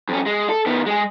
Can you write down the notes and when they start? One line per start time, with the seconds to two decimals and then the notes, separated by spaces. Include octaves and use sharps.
0.09 F2 C#4
0.26 G#3
0.49 A4
0.66 D#3 B3
0.86 G#3 G#4